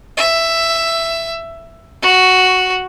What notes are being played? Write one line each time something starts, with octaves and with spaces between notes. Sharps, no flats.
E5
F#4